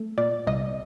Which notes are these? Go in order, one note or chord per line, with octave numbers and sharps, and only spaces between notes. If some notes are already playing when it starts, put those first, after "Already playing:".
Already playing: A3
A#2 D5
C2 D#5